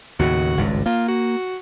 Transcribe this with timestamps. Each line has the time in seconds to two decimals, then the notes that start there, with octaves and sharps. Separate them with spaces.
0.19 D#2 A2 C#3 F#4
0.57 G#1 C#2 G2
0.86 A#3 F4
1.08 F#4